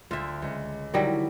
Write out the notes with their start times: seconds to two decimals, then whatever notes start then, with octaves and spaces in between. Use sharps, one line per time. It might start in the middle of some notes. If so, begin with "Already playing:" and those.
0.11 D2 D3 F4 E5
0.42 C#2
0.94 D3 D#3 F#3 G3 E4